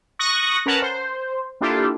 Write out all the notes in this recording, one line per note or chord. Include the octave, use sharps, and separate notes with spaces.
C#6 D#6 F#6 A#6
C#4 A#4 B4 F#5 A5
C5
A#3 D4 E4 F4 G4 A4